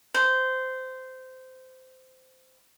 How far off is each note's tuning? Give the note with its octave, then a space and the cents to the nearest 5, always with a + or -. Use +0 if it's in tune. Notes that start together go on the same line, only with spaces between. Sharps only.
C5 -15